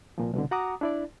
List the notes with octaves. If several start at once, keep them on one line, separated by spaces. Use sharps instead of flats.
C2 A#2 F3
C2 B2 D3
F#4 F#5 A#5 D6 D#6
D4 E4 D5